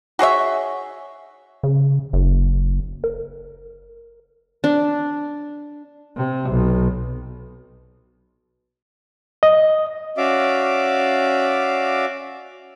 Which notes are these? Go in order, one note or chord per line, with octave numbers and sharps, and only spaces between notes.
F#4 G#4 C#5 E5
C#3
F#1
A#4
D4
C3
B1
D#5
C#4 F#4 D5 E5 F5 D6